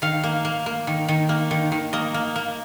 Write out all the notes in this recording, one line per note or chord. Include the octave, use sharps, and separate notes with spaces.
D#3 F5
A#3
A#3
A#3
D#3
D#3
A#3
D#3
D#3
A#3 D#5
A#3
A#3